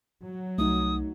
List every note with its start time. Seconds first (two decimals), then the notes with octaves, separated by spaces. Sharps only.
0.24 F#3
0.58 C2 A3 D#4 D#6